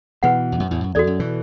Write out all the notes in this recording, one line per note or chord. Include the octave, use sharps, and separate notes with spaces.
B2 E3 F#4 B4 F#5
E2
F#2
E2 A2
F#2
E2 F#4 A4 D5
F#2
B2 E3